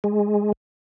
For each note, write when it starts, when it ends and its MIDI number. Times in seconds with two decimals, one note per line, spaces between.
0.04 0.52 56